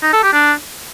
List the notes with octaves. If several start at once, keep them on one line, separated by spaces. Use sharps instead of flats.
D#4
A4
G4
D4